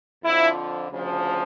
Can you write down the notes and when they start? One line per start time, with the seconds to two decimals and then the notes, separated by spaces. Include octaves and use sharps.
0.25 F2 D3 F3 E4
0.91 D2 C#3 F3